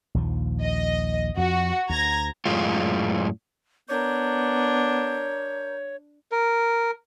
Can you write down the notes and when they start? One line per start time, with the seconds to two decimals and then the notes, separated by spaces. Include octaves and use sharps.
0.15 A#1 D#2 F3
0.63 D#5
1.37 F2 F3 F#4
1.90 D2 A#5 G#6 A#6
2.46 F#2 A2 G#3 F4
3.89 B3 D4 A#4 C#5 G6
6.32 A#4